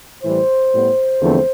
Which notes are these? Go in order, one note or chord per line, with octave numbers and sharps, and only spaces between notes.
A2 E3 G3 C5
A2 G3 B3
E2 D3 F3 A3 C4